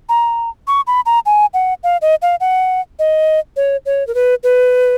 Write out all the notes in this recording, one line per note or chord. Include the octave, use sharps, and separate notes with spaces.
A#5
C#6
B5
A#5
G#5
F#5
F5
D#5
F5
F#5
D#5
C#5
C#5
A#4
B4
B4